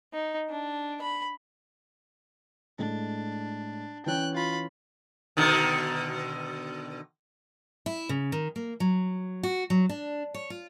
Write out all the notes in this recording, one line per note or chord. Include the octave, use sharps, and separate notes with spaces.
D#4
D4
B5
A2 G#3 D4
E3 C#4 G5 F#6
F4 B5
B2 D3 D#3
E4
C#3
D#3
A#3
F#3
F#4
F#3
D4
C#5
F4